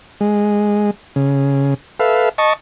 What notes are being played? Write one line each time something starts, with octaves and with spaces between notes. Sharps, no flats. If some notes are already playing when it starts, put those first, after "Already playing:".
G#3
C#3
A4 B4 E5 F5
D#5 A5 C#6